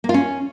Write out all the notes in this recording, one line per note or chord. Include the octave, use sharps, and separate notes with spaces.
A#3
F4
C#4